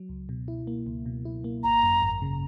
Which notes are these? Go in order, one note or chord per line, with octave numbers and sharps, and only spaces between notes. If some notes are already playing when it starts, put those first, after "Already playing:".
Already playing: F#3
C#2
B2
E4
A#3
C#2
B2
E4
A#3
G#1 A#5
F#2
G#1
C#3